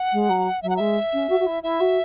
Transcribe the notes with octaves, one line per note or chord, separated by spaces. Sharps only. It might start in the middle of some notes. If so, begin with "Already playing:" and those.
Already playing: F#5
G#3
F#3
F#3 E5
F#5
G#3 E5
C#4
F#4
F#4
E4
E4 E5
F#4